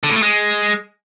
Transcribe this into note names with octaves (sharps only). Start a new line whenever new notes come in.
D3
A2
A3
G#3